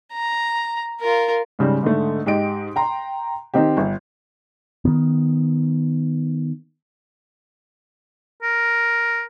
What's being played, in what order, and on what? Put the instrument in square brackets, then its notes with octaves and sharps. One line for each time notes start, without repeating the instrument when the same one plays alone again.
[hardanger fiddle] A#5
F4 A#4
[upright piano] G#2 C#3 G3
G#2 D3 A3
G#2 G4 D#5 D7
G5 A#5 C6
D#3 C4 D#4 G4
G1
[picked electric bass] D#3 B3
[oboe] A#4